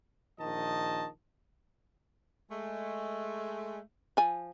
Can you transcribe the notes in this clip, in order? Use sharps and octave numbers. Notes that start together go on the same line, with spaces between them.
A#1 D#3 D#5 A5
G#3 A3
F3 G#5